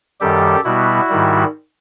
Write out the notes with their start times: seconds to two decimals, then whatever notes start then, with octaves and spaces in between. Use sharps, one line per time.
0.20 F#2 D#3 G3 G4 A4
0.65 B2 G3 B3 E4 F#4
1.09 G#2 D#3 G3